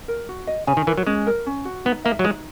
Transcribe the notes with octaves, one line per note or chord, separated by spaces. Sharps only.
A#4
F#4
D#5
C#3 G#5
D#3
E3 A#4
F#3
G#3 C#4
A#4
C#4
F#4
B3 D#4
A#3 E5
F#3
G#3 D#4